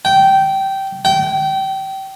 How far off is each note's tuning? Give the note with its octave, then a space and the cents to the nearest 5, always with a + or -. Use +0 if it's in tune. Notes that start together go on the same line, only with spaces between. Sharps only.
G5 -15
G5 -25